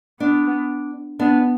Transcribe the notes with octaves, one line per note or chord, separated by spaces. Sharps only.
B3 D4
B3 D4